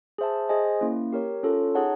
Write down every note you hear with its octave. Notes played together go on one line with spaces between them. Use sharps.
G#4 C5 E5 A5
G#4 C5 D#5 G#5
A#3 C#4 E4
G4 A#4 C#5
C#4 F4 A4 C#5
D#4 G#4 C#5 F#5 A5